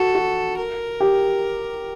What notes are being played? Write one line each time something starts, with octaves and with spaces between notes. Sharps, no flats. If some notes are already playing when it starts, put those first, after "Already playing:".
Already playing: F#4 A4
F#4
A#4
G4